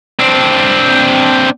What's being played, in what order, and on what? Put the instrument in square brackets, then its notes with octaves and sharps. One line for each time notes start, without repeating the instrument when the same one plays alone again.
[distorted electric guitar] C4 D4